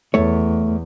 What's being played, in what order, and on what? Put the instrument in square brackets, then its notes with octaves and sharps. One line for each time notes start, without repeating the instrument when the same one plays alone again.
[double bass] E2 [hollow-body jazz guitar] A3 C#5